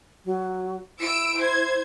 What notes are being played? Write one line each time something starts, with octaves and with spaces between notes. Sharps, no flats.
F#3
E4 E6 D7
C5 G#6